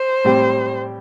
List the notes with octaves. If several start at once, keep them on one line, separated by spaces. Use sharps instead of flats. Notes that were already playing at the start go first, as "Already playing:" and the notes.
Already playing: C5
A2 G3 C4 G4